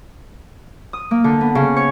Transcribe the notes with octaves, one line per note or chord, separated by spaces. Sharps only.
D#6
A#3
D3
B3
C#3
C#5